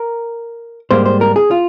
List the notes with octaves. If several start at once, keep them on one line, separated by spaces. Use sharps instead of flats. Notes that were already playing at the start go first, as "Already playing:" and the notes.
Already playing: A#4
G#2 G3 A#3 C5
C5
A#4
G#4
F4